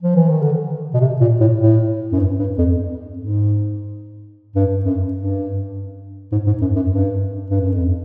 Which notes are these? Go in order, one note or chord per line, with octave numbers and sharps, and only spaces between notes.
F3
E3
D#3
D3
B2
C3
A#2
A2
A2
F#2
G2
G2
F2
G#2
G2
F#2
G2
G#2
G#2
F#2
F#2
G2
G2
F#2
F2